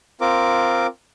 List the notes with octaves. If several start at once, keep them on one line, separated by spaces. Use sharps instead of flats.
C4 F4 A#4 D6